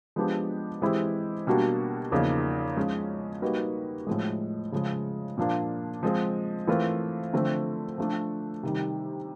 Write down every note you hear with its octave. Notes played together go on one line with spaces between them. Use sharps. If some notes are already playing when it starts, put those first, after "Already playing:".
F3 G#3 B3 D4 G4
E3 G#3 C4 E4 G4
B2 G3 A#3 D4 F#4
E2 C#3 F3 A#3 D#4
F3 G#3 C#4
G3 A#3 D#4 F#4 B4
A2 F3 G#3
C#3 F3 G#3
A#2 F3 A#3 D4 F4
F3 G#3 C4
E3 A3 C4 F4 A#4
D3 F3 A3 C4
F3 A3 D4
C3 D#3 G3